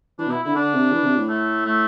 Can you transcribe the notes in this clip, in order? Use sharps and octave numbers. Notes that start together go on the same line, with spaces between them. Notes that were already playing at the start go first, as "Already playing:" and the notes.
E3 D4
B2
E4
D3 E4
D3 D4
C3
E3
C3
A2
A3
A3